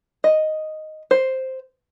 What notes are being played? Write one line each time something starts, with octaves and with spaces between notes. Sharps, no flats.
D#5
C5